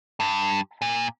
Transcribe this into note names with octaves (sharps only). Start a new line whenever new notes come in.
G2
A#2